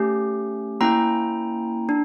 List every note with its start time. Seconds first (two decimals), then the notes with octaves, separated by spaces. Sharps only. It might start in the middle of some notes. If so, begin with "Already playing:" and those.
Already playing: A3 C#4 G4
0.81 A#3 C#4 E4 G5 A#5
1.89 D4